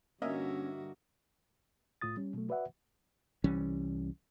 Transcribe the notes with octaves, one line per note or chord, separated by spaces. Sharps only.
G2 D3 A#3 C#4 F#4 D#5 E5
C2 A2 F4 D#6 A6
G3 C#4
B2 F#3 A3
F#4 B4 D5 E5 F#5
C2 E3 G3 C#4